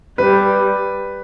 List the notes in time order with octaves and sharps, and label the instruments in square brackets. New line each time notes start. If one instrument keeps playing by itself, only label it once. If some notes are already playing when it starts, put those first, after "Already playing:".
[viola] G3 [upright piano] B4